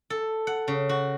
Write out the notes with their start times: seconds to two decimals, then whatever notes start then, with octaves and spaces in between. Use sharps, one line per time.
0.10 A4
0.47 F#5
0.68 C#3
0.89 F#4